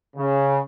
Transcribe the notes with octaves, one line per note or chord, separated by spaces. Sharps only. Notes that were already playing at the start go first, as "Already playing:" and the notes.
C#3